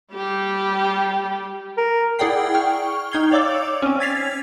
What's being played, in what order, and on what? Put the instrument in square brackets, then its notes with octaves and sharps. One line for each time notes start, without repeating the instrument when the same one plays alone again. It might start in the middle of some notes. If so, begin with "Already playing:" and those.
[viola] G3 G4
[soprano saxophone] A#4
[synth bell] E4 G#4 D5 F#5 G5 C7
G5 C#6 F6
D#4 G5 G#6 C7 G7
C#5 D5 F5 D6 E6 A6
C4 C#4
G#6 A6 B6 C7 F7